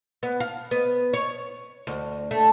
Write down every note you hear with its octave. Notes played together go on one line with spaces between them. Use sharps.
B3
F5
B3
C#5
D2
A3